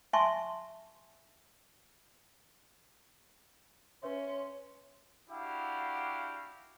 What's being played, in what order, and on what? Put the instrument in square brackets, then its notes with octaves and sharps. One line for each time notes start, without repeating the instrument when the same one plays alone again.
[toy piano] E5 G#5 A5 C6 C#6
[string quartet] C#4 [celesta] B4 C#5 E5 [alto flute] C6
[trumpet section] D4 E4 F#4 G4 F5 F#5